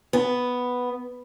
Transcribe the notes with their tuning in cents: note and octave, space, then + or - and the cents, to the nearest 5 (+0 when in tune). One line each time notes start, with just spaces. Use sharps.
B3 +0